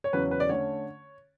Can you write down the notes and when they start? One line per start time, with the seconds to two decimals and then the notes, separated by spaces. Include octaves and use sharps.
0.04 C#5
0.13 E2 C#3 F#3 C#4 B4
0.31 B4
0.40 D5
0.49 D3 A3 C#4 C#5